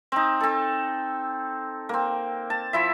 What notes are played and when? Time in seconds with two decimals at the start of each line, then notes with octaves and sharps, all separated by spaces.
0.12 C4 D#4
0.40 C4 A4
1.89 A#3 C4
2.50 A5
2.73 F3 E4 E5